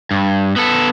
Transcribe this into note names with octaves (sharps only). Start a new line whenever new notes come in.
G2
B3 A4